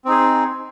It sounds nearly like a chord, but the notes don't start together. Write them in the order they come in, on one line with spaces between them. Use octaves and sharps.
C4 D#4 G#4